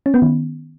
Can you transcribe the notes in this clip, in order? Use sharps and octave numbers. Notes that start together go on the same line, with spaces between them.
C#4
B3
D#3